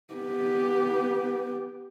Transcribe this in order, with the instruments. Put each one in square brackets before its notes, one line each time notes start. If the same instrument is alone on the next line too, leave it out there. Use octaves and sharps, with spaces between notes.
[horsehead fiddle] B3 G4